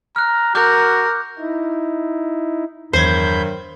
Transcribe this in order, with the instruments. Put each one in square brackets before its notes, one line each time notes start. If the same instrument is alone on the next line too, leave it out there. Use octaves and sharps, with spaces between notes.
[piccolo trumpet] A#5 [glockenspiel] F6 F#6
[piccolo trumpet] F#4 [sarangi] A#4 [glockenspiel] D6 F#6 G6
[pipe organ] D#4 E4
[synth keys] E2 G#6 [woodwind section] G2 D#3 F#3 [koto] C5 [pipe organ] B5 G6